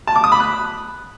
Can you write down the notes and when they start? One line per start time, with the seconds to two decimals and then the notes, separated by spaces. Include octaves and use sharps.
0.07 A5
0.16 D6
0.24 D#6
0.32 B5
0.40 F#6